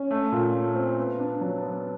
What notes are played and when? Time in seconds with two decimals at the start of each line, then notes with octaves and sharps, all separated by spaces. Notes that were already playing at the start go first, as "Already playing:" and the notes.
Already playing: C#4
0.11 A3
0.32 A#2
0.54 A3
0.75 C4
0.98 B3
1.19 D4
1.41 F#3
1.63 B3